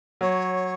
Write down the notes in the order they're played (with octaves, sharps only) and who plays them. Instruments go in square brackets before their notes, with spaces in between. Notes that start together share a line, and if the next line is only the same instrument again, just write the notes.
[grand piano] F#3 [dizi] C#5